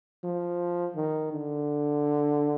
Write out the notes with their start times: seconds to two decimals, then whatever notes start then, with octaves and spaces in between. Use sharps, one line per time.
0.24 F3
0.96 D#3
1.32 D3